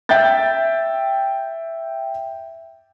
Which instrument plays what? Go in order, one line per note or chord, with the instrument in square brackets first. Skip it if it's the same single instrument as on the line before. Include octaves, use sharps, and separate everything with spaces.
[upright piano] E5 G5 G6 A6